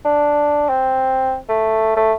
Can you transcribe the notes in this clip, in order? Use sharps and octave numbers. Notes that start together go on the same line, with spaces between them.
D4
C4
A3
A3